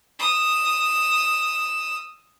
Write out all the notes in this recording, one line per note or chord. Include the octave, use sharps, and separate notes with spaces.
D#6 E6